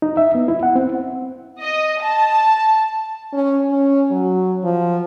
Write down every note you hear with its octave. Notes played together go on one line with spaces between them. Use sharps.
D#4
E5
B3
E4
F#5
C4
D#5
A5
C#4
C#4
F#3
F3